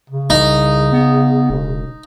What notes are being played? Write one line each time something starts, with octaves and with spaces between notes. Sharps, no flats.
C#3
C2 D#4
B3
E1